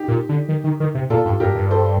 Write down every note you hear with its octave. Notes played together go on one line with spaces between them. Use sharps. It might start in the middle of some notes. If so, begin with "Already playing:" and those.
Already playing: D#4 G4
A#2
D3
D#3
D#3
D#3
C3
A#2 F4 A4
G2
G2 G4 A#4
G2
A4 C5